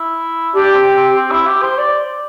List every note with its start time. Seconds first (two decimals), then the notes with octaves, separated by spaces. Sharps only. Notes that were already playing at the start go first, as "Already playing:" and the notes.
Already playing: E4
0.54 D4 G4
0.75 C4
0.96 C4
1.16 C4
1.31 E4
1.47 G4
1.63 C5
1.78 D5